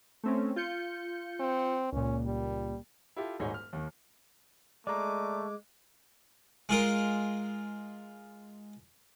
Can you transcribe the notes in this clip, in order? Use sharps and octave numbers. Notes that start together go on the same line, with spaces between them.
A3 C4 C#4
F4 G6 C#7
C4
C#2 A#2 C#4
G3
E4 F4 G4 A4
D#1 G#2 D#4 F#4 G#4 C#5
F6
D#2 D#3
G#3 A3 D5 A#5 D6
G#3 F4 A#4